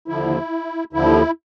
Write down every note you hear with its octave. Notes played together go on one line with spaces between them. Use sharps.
D#2 D3 F3 E4
D#2 D3 F3 E4